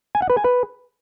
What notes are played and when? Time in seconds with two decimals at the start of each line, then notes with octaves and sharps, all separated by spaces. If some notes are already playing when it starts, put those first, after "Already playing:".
0.15 G#5
0.22 F#5
0.30 B4
0.37 G#5
0.44 B4